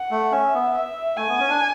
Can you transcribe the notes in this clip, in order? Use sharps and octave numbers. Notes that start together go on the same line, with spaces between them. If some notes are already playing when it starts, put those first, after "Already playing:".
Already playing: F#5
A3
C#4 E5
B3
E5
A3 G#5
B3
C#4
D4